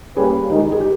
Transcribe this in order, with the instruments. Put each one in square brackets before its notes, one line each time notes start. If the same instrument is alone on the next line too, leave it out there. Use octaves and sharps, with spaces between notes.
[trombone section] G3 A#3 C#4 G4 B4 [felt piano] G#4
[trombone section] D#3 G#3 D#4 [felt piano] G4
[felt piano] G4
G#4
G4